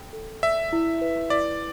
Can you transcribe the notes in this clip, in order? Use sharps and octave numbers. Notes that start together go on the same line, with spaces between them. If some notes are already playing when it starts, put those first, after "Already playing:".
Already playing: A4 G5
A4
D5 E5
E4
B4
E4 D5